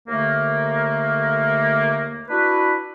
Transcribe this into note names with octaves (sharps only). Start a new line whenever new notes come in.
D#2 D3 A3 A#3
D4 E4 F#4 B4